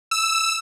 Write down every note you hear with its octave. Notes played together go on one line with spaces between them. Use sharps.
E6